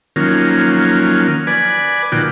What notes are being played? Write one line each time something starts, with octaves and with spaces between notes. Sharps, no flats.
D#3 F3 F#3 A#3 C#4
B4 D5 G#5
A#2 D#3 F3 F#4 G5 D6